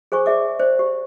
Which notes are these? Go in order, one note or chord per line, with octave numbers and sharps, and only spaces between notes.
G#4 C5 G#5 C#6
G#4 D5 E5 D6
C5 D5
G4